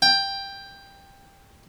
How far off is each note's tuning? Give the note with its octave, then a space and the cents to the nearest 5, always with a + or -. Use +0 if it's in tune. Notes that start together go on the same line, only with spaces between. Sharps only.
G5 +10